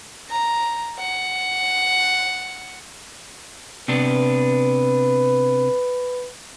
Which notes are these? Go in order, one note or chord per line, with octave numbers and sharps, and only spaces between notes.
A#5
F#5
C3 B3 D4 B4